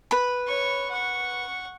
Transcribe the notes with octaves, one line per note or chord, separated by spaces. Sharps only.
B4 B5
C#5 C#6
F#5 C#6